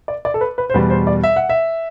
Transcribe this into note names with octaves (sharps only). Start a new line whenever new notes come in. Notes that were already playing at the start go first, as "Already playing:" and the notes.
D5
D5
A4
B4
B4
C5
E2 B2 G3 B4
C5
D5
E5
F#5
E5